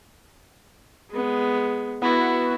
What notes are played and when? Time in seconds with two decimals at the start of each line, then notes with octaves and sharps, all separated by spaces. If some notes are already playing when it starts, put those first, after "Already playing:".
1.11 G#3 B3
2.02 B3 E4 F#4